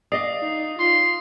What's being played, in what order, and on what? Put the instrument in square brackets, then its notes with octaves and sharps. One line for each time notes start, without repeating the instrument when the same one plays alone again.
[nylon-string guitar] D5 D#5 F5 [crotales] D#6 C7
[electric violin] D#4
[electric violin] F4 [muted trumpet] C6